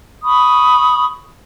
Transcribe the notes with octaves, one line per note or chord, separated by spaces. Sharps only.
B5 C#6 D#6